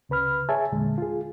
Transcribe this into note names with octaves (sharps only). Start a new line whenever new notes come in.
C#2 C#3 B4 B5 F6
G#4 C#5 E5 G#5 A5
E2 A#2 D3 G#3
F4 G#4